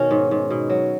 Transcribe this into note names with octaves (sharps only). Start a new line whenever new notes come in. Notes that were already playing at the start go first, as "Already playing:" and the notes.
Already playing: B2 D#3 C#4 F#4
G#2
G#2
B2
F#3